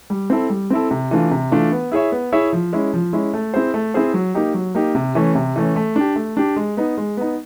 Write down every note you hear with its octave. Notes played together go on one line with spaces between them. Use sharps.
G3
C4 E4 A4
G3
C4 E4 A4
C3
E3 A3 D4 F4
C3
E3 A3 D4 F4
B3
E4 G#4 C#5 E5
B3
E4 G#4 C#5 E5
F3
G#3 C#4 E4
F3
G#3 C#4 E4
A3
C4 E4 G#4 C5
A3
C4 E4 G#4 C5
F#3
A#3 D#4 G4
F#3
A#3 D#4 G4
C3
E3 A3 C#4
C3
E3 A3 C#4
A3
D4 G4
A3
D4 G4
G#3
B3 D#4
G#3
B3 D#4